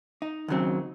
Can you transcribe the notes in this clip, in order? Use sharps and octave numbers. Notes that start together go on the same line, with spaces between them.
D#4
D#2 C#3 F#3 C4